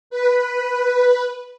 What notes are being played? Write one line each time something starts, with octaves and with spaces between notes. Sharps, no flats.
B4